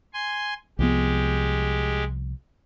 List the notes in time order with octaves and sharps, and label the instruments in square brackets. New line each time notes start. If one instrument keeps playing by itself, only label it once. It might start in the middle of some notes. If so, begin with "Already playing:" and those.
[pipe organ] G#5 C6
[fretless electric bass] C2 F3 B3 [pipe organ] G#3 G4